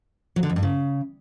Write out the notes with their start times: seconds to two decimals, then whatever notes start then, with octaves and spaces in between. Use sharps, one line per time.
0.36 F#3
0.43 D3
0.49 F2
0.56 G2
0.63 C#3